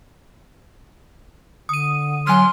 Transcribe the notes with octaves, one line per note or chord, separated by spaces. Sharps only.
D3 D#6 D#7
F#3 G#5 C6 F6